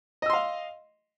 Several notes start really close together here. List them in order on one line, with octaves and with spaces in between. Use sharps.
D#5 E6 C6 F5